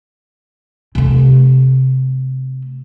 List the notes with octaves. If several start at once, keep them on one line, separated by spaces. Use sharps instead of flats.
C3 A3